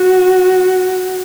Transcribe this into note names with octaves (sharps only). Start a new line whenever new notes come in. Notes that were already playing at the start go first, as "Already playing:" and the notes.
Already playing: F#4